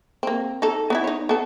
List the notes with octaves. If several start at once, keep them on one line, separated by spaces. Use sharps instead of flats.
A#3 C4
D#4 A4
B3 D#4 E4
D#4 C#5
B3 A4